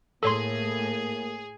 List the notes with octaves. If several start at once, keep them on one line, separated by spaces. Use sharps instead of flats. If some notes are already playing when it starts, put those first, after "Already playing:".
A2 A#3 G#4 A4 C#5 C6